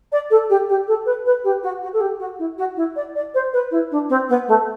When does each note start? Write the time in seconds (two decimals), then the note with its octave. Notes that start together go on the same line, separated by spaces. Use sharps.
0.12 D5
0.31 A4
0.50 G4
0.69 G4
0.88 A4
1.06 B4
1.26 B4
1.44 G4
1.63 F#4
1.82 F#4
1.93 A4
2.01 G4
2.20 F#4
2.39 E4
2.58 F#4
2.77 E4
2.96 D5
3.16 D5
3.35 C5
3.53 B4
3.71 E4
3.91 D4
4.09 C4
4.29 B3
4.48 A3